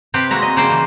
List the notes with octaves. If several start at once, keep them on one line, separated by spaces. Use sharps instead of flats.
C3 C4 G4 B4
G#3 A#3 F#4 E5 A#5
D#5
C#3 F3 G3 A#3 C5 G5
E3